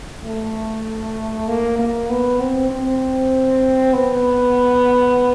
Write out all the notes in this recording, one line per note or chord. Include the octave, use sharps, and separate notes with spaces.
A3
A#3
A#3
B3
C4
C4
B3